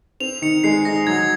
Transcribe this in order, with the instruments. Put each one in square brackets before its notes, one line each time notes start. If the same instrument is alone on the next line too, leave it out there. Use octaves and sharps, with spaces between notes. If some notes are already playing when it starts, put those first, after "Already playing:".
[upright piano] C4 [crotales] F7
[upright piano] D#3 [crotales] C#7
[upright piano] G#3 [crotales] C7
[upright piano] D#4 [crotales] A#6
[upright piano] F#3 [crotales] G#6